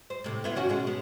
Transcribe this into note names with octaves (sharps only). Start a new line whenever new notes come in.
C5
A2 C3
B3 E4 F4
D#3 C#4 F#4
B2 G#3 C#4
B3